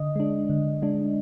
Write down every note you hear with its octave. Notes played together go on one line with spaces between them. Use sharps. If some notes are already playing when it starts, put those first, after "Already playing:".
Already playing: D3 D#5
G#3 D4
D3
G#3 D4